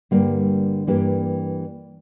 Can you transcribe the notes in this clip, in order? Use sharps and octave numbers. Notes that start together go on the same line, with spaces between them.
G2 D3 G3 A#3
G2 E3 A#3 D4 G4